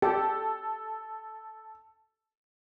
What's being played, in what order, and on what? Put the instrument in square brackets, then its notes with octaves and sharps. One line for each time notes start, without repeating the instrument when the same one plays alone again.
[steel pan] G4 [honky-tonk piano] A4